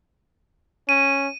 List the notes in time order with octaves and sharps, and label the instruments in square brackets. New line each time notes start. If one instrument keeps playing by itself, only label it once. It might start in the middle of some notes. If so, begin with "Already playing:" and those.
[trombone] C#4 [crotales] D#7